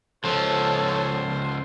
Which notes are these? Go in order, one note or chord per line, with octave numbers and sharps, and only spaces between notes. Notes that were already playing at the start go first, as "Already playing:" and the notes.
C#2 F3 A4 C5 C#5
C5